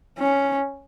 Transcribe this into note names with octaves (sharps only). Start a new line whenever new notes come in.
C#4